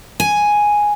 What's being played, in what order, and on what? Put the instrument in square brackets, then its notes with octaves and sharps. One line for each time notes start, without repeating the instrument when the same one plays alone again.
[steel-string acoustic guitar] G#5